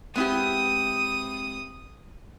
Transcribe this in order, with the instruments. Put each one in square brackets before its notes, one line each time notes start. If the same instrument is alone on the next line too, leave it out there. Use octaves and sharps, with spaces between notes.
[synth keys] G#3 C4 [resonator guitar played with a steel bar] B3 E4 G4 [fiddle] D#6